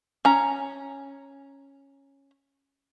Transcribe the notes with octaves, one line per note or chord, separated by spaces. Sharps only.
C#4 A#5